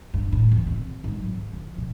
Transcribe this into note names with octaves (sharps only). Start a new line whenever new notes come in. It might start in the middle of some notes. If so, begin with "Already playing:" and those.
G2
A2
E2
C3
G#1
F#3
D3
F3
B2